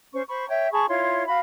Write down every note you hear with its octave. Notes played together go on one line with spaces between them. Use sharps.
C#4 C5 C#6
C5 B5 C#6
C#5 E5 G5
G#4 A5 B5 C#6
E4 F4 C#5 C6
F#4 F5 B5